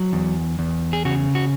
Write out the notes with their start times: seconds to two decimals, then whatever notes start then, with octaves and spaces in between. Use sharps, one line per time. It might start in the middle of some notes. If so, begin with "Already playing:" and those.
Already playing: F#3
0.13 E2
0.59 E2
0.93 G#4
1.05 C#3 F#4
1.35 F#4